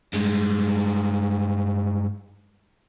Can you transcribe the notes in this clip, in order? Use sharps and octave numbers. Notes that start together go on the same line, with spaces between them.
G2 G#3